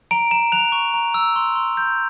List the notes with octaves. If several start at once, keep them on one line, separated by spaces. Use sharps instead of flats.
A#5 D7
A#5 E7
F#6 F7
C#6
A#5
E6
C6
C6
G6